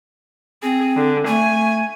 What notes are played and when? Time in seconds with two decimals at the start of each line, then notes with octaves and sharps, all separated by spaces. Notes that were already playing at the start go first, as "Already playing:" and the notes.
0.63 C4 G#4
0.96 D3
1.27 A3 G#5